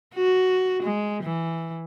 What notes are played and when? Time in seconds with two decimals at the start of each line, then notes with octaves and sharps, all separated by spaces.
0.15 F#4
0.83 G#3
1.23 E3